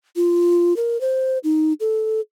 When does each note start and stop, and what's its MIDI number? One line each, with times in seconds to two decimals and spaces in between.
0.16 0.76 65
0.76 1.00 70
1.01 1.38 72
1.44 1.73 63
1.80 2.20 69